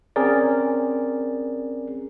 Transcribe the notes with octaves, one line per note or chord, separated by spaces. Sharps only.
C4 C#4 G#4 A#4 D5